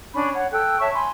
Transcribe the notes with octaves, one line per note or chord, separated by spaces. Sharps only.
C#4 D4 G#5 B5
C#5 F#5
A4 G5 E6 F#6
C#5 E5 A5 C#6
G#5 B5 C6